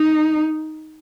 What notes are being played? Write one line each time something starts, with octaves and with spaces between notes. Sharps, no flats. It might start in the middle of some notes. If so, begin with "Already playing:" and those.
Already playing: D#4